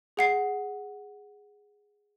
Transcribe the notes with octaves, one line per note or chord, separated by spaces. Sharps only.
G#4 F#5 C7